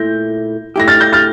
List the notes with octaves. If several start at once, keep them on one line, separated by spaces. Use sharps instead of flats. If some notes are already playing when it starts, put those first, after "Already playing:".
Already playing: A#2 A3 E4 G6 A#6
A3 E4 G4 A#6
F6 A6
G6 A#6
F6 A6